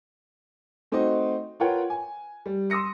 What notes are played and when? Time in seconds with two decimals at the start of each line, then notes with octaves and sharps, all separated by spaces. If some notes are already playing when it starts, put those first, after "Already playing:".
0.92 A3 C4 D#4 F#4 D#5
1.60 F4 A#4 B4 C#5 F#5 G5
1.90 G#5
2.46 G3
2.70 C6 D#6 E6 A#6 C#7